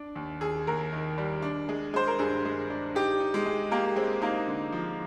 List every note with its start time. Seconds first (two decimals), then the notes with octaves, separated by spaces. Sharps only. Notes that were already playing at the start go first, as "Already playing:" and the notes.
Already playing: D4
0.15 D#2
0.41 D#2 G#4
0.67 D#2 A#4
0.93 D#3
1.18 G3
1.42 D4
1.69 G#3
1.94 G#3 C5
2.07 A#4
2.19 G2 G#4
2.45 G#3
2.70 D4
2.95 D#4 G4
3.20 D#4
3.34 G#3
3.46 G#3
3.71 A#3 G4
3.96 G#3 C4
4.22 A#3 D#4
4.47 D3
4.72 F3